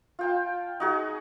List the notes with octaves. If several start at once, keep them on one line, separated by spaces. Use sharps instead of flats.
F4 G5 A5
D#4 F#4 G#4